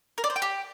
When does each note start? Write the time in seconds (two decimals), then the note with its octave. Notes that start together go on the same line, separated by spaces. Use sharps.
0.18 A#4
0.24 D5
0.30 C5
0.36 G5
0.42 G4